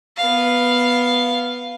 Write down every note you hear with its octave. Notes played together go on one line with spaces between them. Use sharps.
B3 F5